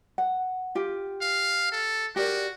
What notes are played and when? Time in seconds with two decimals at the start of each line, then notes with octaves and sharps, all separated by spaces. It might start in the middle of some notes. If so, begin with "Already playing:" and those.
0.18 F#5
0.75 F4 G4
1.22 F5
1.72 A4
2.16 F#4 G4 A#4 D5